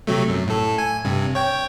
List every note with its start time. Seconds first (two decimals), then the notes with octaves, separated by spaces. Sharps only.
0.07 C3 F#3 A3
0.29 F#2
0.48 A2 A4
0.78 G#5
1.04 G2 C3
1.35 C#5 G5